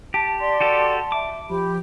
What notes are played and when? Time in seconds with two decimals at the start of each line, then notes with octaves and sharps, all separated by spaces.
0.14 G4 A5
0.40 D5 C6
0.61 F#4 G4 A4
1.12 E5 D6
1.50 F3 G4 B5